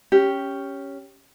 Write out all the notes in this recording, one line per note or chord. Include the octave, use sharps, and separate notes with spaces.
C#4 G4